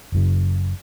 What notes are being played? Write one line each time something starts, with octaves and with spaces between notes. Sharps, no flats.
F#1 F#2 C#3